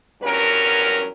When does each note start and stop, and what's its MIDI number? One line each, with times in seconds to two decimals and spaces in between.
0.22 1.09 40
0.22 1.09 43
0.22 1.09 54
0.22 1.09 61
0.22 1.09 70